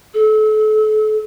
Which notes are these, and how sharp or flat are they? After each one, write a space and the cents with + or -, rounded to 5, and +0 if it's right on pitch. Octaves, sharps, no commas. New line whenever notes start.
A4 -35